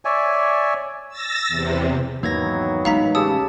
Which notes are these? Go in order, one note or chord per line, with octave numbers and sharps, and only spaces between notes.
C#5 D5 E5 G#5
E6 A6 A#6
E2 C3
E2 G#2 D#3 F#3 A#3 B3 G#6 A#6
A1 G#3 D#4 F5 A#5 B6
C#3 G4 A5 D#6 E6